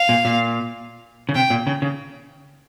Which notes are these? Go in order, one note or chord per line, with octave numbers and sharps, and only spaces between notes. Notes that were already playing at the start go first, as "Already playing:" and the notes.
Already playing: F5
A#2
A#2
C#3
C3 G5
A#2
C#3
C#3